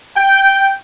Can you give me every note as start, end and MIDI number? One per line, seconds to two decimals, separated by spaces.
0.16 0.69 79